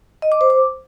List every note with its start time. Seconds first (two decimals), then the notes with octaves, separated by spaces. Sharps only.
0.22 D#5
0.32 D6
0.41 C5
0.50 D6